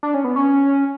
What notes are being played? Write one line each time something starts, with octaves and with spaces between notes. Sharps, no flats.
D4
C#4
B3
C#4